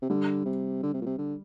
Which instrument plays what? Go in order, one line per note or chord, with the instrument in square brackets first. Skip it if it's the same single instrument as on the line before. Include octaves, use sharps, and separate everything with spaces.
[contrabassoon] C3
[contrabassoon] D3 [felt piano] G3
[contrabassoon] C3
D3
C3
A#2
C3
D3